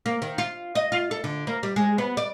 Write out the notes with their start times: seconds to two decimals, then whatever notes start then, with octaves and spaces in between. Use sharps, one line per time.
0.06 A#3
0.22 D#3
0.38 F4
0.75 D#5
0.92 F4
1.11 A4
1.24 D3
1.47 A#3
1.63 G3
1.76 G#3
1.98 B3
2.17 D5